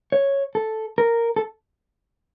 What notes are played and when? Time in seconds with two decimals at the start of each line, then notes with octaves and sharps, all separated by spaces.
0.12 C#5
0.55 A4
0.98 A#4
1.36 A4